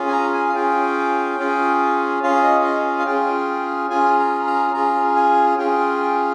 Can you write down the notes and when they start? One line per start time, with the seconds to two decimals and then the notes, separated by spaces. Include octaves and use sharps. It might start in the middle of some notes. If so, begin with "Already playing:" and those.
Already playing: C#4 F4 G#4
0.08 G#5
0.13 A#5
0.34 G#5
0.49 F5
0.54 C#4 F4 G#4 G5
1.39 C#4 F4 G#4
2.23 C#4 F4 G#4 F5
2.44 D#5
2.64 D#5
2.99 F5
3.06 C#4 F4 G#4 G5
3.90 C#4 F4 G#4 G#5
4.19 A#5
4.47 A#5
4.74 C#4 F4 G#4 A#5
5.16 G#5
5.58 C#4 F4 G#4 G5